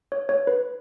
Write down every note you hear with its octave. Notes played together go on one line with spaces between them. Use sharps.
C#5
C#5
B4